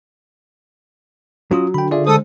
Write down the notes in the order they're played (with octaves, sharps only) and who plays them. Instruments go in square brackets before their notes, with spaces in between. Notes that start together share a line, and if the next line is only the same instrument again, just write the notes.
[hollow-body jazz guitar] F#3 [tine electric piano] C#4 F4 D#6
[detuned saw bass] D3 [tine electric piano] G5 B5
[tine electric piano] F4 D5 E5 [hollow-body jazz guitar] G#4
[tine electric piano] G#3 C5 [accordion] A4 D#6